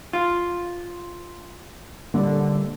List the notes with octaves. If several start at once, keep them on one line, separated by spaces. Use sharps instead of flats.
F4
A#2 D3 G3 A#3